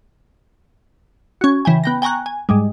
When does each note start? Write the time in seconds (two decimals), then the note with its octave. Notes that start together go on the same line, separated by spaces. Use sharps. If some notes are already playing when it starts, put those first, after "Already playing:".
1.41 C#4 F#4
1.65 C#3 E3 G5 G#5
1.84 B3 G5 A#6
2.02 G5 G#5 A#5 C#6 F#6
2.26 G#5
2.49 G#2 G3 G#3